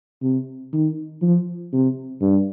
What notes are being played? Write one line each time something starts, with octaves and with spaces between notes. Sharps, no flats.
C3
D#3
F3
C3
G2